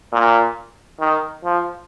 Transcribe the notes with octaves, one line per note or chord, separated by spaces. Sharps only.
A#2
D#3
F3